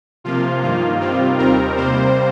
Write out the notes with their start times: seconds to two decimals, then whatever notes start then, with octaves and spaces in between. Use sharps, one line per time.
0.24 C3 F3 A#3 F4
0.62 G2 D#3 A#3 F4
1.00 C3 D#3 G3 C4 F4
1.38 D#2 D#3 G3 C4 A#4
1.77 C3 G3 A#3 C5